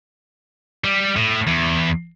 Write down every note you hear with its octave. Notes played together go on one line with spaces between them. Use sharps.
G3
A2
E2